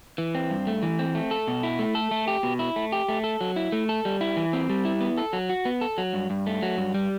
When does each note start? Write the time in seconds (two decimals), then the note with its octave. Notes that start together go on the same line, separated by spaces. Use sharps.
0.18 E3
0.35 C4
0.50 G2
0.67 A3
0.83 E3
0.99 C4
1.15 A3
1.31 A4
1.48 B2
1.63 E4
1.79 A3
1.95 A4
2.11 A3
2.28 G4
2.43 B2
2.59 E4
2.76 A3
2.92 G4
3.09 A3
3.24 A4
3.41 F#3
3.56 E4
3.72 A3
3.89 A4
4.05 G3
4.21 E4
4.37 E3
4.53 C4
4.69 G3
4.85 E4
5.01 B3
5.18 A4
5.33 F#3
5.49 F#4
5.65 B3
5.81 A4
5.98 F#3
6.13 G2
6.30 G2
6.46 A3
6.62 F#3
6.78 G2
6.94 G3